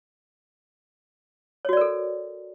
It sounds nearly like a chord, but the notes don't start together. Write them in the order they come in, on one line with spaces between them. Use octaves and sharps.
C#5 F#4 D5 A#4 A4